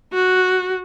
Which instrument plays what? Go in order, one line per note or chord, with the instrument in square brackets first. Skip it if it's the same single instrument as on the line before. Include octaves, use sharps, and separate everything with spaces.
[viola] F#4